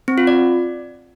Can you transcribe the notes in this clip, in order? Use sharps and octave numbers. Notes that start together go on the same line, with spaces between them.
C4
F4
D5